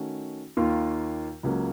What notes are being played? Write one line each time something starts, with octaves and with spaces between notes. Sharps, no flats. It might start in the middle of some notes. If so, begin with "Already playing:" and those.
Already playing: D#3 A3 C#4 F#4
D#2 D#3 A#3 F4
C#2 C#3 F#3 A#3